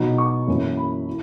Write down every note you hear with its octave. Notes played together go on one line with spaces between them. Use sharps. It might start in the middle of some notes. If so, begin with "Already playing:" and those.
Already playing: B2 F#3 B3 D#4
C#6
F#2 E3 A#3 C#4 E4
B5
E4